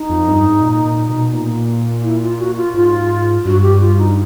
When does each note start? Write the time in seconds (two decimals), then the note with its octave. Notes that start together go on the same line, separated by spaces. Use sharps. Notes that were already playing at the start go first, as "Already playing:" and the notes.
Already playing: D#4
0.10 F2
0.27 G2
0.45 G#2
0.61 A#2
0.85 A#2
1.09 B2
1.33 A#2
2.03 E4
2.21 F4
2.39 F#4
2.57 F4
2.74 G#2 F4
3.45 G2 F#4
3.63 G4
3.80 F4
3.98 D#4